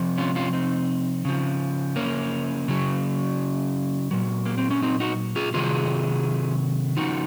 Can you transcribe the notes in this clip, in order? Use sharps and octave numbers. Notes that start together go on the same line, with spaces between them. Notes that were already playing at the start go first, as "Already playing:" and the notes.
Already playing: C3 F3
C#4 F4
C#4 F4
C4 D#4
C#3 F3
A#3 C#4
C#3 F#3
A#2 F#3
A#3
C4
C#4
C4 D#4
D#4 F#4
F4 G#4
C3 D#3 F#3 F4 G#4
C#3 F3 D#4 F#4